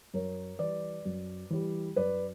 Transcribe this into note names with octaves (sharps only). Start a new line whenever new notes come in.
F#2 A#4 C#5
E3 G3 B4 D5
F#2
E3 G3
F#2 B4 D5